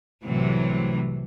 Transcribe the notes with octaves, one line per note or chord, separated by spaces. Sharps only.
C2 A2 C3 E3 F#3